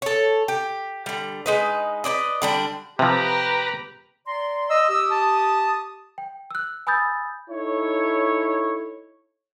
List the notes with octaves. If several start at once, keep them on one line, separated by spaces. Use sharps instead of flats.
A4 C#5
G4
D3 G3
G#3 D#4 B4
B4 C5 D5 D#5
D3 G3 D4
C3 F3 G4 B4 A#5
D5 A#5 C6
D#5 E6
G4 D#6 E6
A5
G5
E6 F#6
G#5 B5 D#6 E6 G6 A6
D#4 E4 A4 C#5